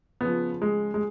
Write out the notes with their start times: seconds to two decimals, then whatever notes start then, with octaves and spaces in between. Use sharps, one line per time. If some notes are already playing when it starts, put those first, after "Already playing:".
0.21 C#3 F3 B3
0.62 G#3
0.94 G#3